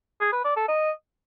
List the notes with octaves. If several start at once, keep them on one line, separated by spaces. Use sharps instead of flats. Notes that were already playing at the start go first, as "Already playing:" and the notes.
G#4
B4
D5
A4
D#5